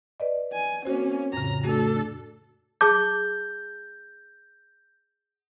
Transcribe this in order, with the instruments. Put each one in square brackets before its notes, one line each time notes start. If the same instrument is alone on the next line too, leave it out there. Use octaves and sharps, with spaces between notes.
[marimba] B4 D5 D#5
[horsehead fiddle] G#5
[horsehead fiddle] A#3 C#4 [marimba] C4 F#4 C5
[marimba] F2 A2 C#3 [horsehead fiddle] A#5
[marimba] A3 F#4 [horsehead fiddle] D4 A4
[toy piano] G#4 A5 D6 [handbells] G6